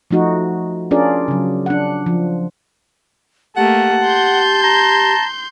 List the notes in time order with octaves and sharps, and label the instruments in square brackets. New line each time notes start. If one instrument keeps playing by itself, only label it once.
[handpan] F3 A3 D#4 F#4
C#4 D4 F4 G#4 A#4 D5
C#3 F#3
D4 F#5
F3
[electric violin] A3 A#3 [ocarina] G4 [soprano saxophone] F#5 [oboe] A5
[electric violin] C6 G6
[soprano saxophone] A5 [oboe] A#5